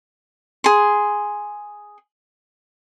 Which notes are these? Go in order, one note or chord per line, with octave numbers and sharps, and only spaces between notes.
G#4 C6